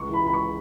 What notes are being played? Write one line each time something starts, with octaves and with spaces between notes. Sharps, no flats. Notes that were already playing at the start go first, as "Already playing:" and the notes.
Already playing: C#2 C#6
E3 B5
C#2 B5
C#6